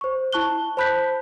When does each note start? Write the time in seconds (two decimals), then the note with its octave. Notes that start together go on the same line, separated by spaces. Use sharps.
0.01 C5 C#6
0.33 E4 A5 C#6 F#6 G7
0.77 C5 A5 B5 F#6 G6 B6